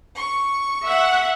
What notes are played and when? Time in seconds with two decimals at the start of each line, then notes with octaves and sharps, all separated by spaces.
0.16 C#6
0.86 E5 F#5